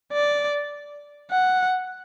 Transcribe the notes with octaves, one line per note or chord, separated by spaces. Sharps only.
D5
F#5